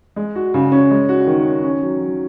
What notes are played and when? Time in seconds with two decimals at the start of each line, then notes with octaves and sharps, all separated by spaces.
0.16 G#3
0.35 F#4
0.54 C#3
0.72 C#4
0.91 G#3
1.09 F#4
1.27 D#3
1.45 C#4
1.64 C#4
1.82 F#3
2.00 F#3